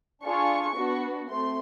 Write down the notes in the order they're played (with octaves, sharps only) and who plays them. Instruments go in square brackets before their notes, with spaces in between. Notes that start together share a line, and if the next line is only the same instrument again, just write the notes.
[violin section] D4 F4 G#4 C#6
B3 D4 F#4
A3 C4 C6